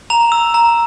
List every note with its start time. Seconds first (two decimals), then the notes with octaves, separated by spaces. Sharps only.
0.10 A#5 F7
0.32 E6
0.54 A#5